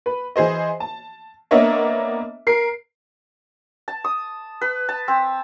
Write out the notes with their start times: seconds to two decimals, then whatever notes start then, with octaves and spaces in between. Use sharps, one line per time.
0.06 B4
0.36 E3 G#4 C5 D#5
0.80 A5
1.51 A#3 B3 D4 C#5 D#5 E5
2.47 A#4 C7
3.88 A5
4.04 D#6
4.61 B4
4.89 A5
5.08 C4